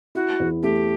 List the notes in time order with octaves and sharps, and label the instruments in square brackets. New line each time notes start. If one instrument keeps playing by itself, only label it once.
[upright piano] E4 [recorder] F#4
[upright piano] E2
[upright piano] A3 [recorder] G4